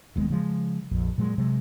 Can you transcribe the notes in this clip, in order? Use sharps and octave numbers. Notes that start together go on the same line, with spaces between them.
E1 D#2 G#3 B3
C#3 F3 G#3
A#1 F2
A#2 F#3 G#3
C3 F#3 G#3